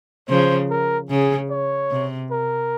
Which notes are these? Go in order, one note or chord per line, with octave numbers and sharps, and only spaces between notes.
C#3 F3 C5
A#4
C#3 G#4
C#5
C3
A#4